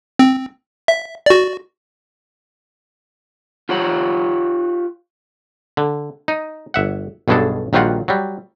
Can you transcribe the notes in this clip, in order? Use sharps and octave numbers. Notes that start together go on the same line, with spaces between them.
C4
E5
F#4 D5
F4 G4 C#5 F#5
D3
D#4
G1 E5 F#5
B1 G2 B2 G#3 D4 A4
A#1 D#3 F#3 G3 F4 F#5
F#3 G3